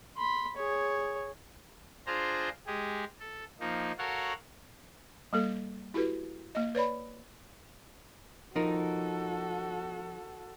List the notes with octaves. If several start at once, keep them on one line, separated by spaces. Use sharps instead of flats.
B5 C6
G#4 C#5
D4 F4 G#4 C5 A#5
G#3 G4 G#4
A4
F3 A#3 D#4
F#4 A4 A#4 C#5 F5 F#5
G3 A#3 A4
E4 F#4 G4 A4 B4
A#3 D#5
B4 C#5 D5 B5
F3 D#4 F#4 A4 A#4